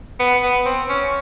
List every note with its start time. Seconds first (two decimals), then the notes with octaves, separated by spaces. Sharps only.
0.19 B3
0.43 B3
0.65 C4
0.89 C#4